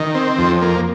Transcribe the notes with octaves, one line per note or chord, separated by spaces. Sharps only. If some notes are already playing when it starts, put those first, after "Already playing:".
Already playing: D#3
C4
F2
A#3